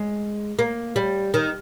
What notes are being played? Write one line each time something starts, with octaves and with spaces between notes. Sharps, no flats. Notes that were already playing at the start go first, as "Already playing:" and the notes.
Already playing: G#3
A#3
G3
D#3